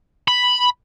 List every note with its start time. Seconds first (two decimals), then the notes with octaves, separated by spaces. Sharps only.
0.28 B5